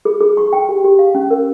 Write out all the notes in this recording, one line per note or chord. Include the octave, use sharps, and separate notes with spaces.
G#4
G#4
C#6
G5
G4
G4
F5
C#4
A#4